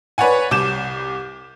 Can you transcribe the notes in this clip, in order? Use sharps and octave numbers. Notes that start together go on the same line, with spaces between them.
B4 C#5 D5 F#5 G#5
C2 D6 G6 E7